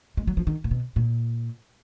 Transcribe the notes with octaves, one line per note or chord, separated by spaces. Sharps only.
G#3
F#3
F3
D#3
A#2
B2
A#2